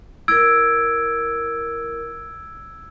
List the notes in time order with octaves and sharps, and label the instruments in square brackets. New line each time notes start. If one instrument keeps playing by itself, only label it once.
[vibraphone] E4 A#4 [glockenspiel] E6 G#6 D7